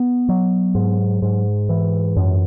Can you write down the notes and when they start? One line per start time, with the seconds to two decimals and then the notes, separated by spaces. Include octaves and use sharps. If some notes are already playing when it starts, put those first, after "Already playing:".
Already playing: B3
0.29 F#3
0.75 G#2
1.22 G#2
1.69 E3
2.17 F#2